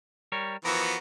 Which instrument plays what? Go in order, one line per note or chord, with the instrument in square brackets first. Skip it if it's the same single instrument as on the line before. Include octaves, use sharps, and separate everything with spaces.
[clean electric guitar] G3 A#4 C#5
[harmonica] E3 F3 B3 [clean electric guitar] F#4 A#4